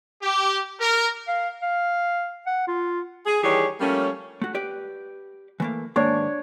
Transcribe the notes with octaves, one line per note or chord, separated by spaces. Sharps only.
G4
A#4
F5
F5
F#5
F4
G#4
D#3 E3 G3 G4 G#4 C#5
F3 G3 A3 A#3 C#4
A3 F#4
G4 B4 D5
E3 A3 A#3
D#2 G#2 A#3 D4 C#5